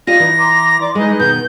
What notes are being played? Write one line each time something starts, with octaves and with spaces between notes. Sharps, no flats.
D#4 F4 G4 D5 D#5 A#6
E3
A#5 C6 D6
D5 C6 D6
G#3 D#4 G#4 B4 D#5
B2 D#3 G6